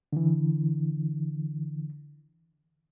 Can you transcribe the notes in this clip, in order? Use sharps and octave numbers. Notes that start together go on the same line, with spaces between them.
D3 E3